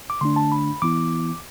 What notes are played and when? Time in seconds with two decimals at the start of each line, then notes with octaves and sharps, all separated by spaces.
0.10 D6
0.21 D3 A3 D4 C6
0.36 A5
0.52 B5
0.82 E3 B3 E4 D6